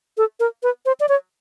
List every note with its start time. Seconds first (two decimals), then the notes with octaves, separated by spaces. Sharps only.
0.18 A4
0.40 A#4
0.63 B4
0.86 C5
1.00 D5
1.09 C#5